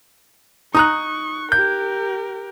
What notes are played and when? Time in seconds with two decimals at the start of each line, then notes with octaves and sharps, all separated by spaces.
0.75 D#4 A#5 C#6 D#6 F#6
1.52 G4 A#4 G6